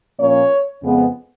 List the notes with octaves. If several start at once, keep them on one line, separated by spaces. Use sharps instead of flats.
A#2 F3 A#3 C#4 C#5
F2 C#3 G#3 B3